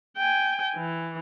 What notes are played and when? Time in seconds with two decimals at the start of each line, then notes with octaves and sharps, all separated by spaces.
0.18 G5 G#5
0.76 E3